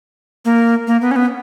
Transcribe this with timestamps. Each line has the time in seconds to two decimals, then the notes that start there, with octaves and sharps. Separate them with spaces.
0.45 A#3
0.87 A#3
1.01 B3
1.11 C#4
1.16 B3